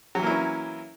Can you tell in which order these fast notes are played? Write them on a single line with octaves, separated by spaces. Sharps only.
F#3 E3 A#3 E4 C#4